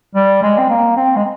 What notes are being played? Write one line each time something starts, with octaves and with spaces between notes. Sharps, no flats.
G3
G#3
C4
A#3
C4
G#3